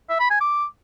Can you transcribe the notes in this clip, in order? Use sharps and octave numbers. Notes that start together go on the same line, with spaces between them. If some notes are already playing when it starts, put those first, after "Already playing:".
E5
B5
G#5
D6